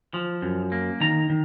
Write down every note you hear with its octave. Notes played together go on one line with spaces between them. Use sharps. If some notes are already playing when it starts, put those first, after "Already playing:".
F3
F#2
A#3
D#3 A#5
D#3